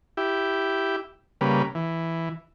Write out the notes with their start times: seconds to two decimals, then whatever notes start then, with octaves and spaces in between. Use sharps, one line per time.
0.17 E4 G4
1.41 C#3 G3 A#3 B4
1.75 E3